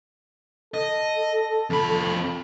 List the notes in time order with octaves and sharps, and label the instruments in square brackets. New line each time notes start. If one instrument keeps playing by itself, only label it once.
[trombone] A4 [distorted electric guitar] D#5
[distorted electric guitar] F2 B5